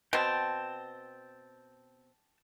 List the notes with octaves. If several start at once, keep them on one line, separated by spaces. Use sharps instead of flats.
B2 C4 G5 A5